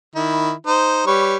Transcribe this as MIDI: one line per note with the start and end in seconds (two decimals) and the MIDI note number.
0.15 0.52 51
0.15 0.52 64
0.67 1.06 63
0.67 1.06 72
1.07 1.37 55
1.07 1.37 71
1.07 1.37 73